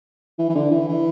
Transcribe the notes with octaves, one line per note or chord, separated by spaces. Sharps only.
E3
E3
D3
E3
E3